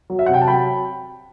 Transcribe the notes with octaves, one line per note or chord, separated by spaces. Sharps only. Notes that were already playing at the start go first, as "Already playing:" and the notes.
F#3
E5
F#5
C3 G5
A5
F#3 G5 B5